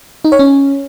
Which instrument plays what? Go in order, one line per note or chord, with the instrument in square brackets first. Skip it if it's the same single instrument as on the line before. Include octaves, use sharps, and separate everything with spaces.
[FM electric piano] D#4
C#5
C#4